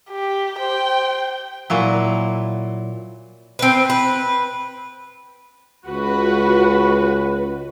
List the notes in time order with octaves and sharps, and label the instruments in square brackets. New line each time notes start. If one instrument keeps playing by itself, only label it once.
[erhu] G4
[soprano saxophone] C5 [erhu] G5
[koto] A#2 F#3 E4
[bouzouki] C4 B4
B4
[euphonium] C#2 [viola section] F#4 B4